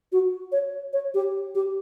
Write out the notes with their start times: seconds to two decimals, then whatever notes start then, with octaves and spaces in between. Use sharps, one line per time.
0.12 F#4
0.52 C#5
0.93 C#5
1.14 G4
1.55 G4